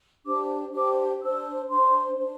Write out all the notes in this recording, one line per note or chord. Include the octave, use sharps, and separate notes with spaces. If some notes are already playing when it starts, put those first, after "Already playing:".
D4 G4 C5 D6
D4 G4 C5 D6
D4 C5 E6
D4 C5 C6
D4 C5